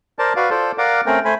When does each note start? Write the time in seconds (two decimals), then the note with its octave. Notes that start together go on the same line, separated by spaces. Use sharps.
0.19 A#4 C5 D5 A5
0.36 F#4 B4 D5 F5
0.50 F4 A4 C5 D5
0.78 A#4 D5 F5 F#5 D6
1.06 A3 C4 C#4 A#4 G5
1.25 A3 C5 G#5 B5